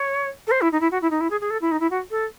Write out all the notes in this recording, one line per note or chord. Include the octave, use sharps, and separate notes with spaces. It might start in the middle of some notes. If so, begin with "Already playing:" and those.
Already playing: C#5
A4
C5
E4
D#4
E4
F#4
E4
D#4
E4
G#4
G#4
A4
E4
D#4
E4
F#4
A4